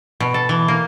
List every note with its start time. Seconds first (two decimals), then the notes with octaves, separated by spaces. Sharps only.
0.20 B2
0.34 A4
0.49 E3
0.68 A#3